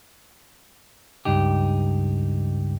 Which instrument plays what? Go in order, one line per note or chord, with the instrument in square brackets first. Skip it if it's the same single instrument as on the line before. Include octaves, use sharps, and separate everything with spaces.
[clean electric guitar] C#2 G2 D#4 G4